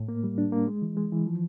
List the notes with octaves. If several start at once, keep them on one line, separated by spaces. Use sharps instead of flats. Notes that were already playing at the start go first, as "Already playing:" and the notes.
Already playing: A2
A#3
G3
D4
A#3
G#3
E3
G#3
E3
F3